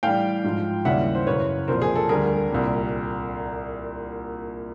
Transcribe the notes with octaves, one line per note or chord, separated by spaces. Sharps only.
A2 E3 G3 F5 G5
G#2 F3
D#2 C#3 E3 G3 E5 F#5
C5
F#2 C#3 E3 B4 C#5
C2 A#2 F3 A#4 C5
G#4
A4
D2 D3 G3 G#4 A#4
C2 A#2 G3